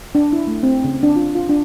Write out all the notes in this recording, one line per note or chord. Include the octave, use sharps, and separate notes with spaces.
D4
E4
A3
C4
C#3
D4
F4
F4
D4